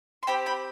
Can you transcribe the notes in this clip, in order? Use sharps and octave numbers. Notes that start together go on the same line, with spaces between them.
C6
C4 G4 G5 B5
G5 B5